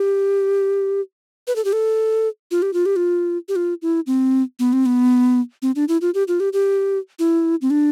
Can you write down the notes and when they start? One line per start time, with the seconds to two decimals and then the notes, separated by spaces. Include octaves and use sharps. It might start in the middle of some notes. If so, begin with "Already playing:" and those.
Already playing: G4
1.47 B4
1.56 A4
1.65 G4
1.73 A4
2.51 F4
2.62 G4
2.73 F4
2.86 G4
2.96 F4
3.48 G4
3.56 F4
3.82 E4
4.07 C4
4.59 B3
4.73 C4
4.86 B3
5.62 C4
5.76 D4
5.88 E4
6.01 F4
6.14 G4
6.28 F4
6.40 G4
6.53 G4
7.19 E4
7.62 C4
7.70 D4